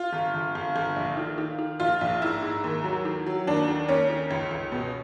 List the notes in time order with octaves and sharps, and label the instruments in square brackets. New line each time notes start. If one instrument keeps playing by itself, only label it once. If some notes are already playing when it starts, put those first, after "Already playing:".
Already playing: [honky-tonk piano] F4
G1
G1
G1
G1
A#1
D#3
D#3
D#3
A#1 F4
A#1
G#2 E4
G#2
D#2
F#3
D#3
F#3
D#2 D4
D#3
D#2 C#4
D#3
C#2
C#2
B2